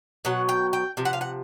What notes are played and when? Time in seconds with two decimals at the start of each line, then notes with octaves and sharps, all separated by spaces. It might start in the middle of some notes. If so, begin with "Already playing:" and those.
0.25 B2 F#3 F#5
0.49 G5
0.73 G5
0.97 C3 F3
1.05 F#5
1.13 F5
1.21 F#5